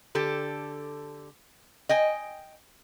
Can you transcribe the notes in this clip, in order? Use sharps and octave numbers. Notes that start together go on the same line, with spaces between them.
D3 G4 A4
D#5 G5 G#5